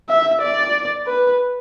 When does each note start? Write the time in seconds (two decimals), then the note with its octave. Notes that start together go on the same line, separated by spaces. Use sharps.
0.10 E5
0.42 D5
1.07 B4